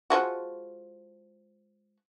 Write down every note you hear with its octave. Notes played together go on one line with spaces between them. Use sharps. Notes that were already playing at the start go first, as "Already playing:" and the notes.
F3 G#3 F#4